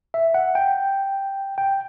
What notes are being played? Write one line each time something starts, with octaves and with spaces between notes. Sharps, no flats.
E5
F#5
G5
G5